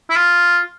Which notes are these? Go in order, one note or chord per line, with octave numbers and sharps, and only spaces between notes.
E4
F4